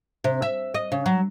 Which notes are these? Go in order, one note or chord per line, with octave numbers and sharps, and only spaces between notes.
C3
E5
D#5
C#3
F#3